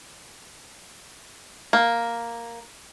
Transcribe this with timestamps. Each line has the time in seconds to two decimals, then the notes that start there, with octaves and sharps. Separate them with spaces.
1.73 A#3